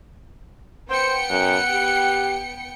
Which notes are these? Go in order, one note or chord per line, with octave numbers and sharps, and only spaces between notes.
B3 C5 G5 C#7
F#2 F#5
G4